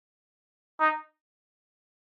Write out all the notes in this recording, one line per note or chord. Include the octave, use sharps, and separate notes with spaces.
D#4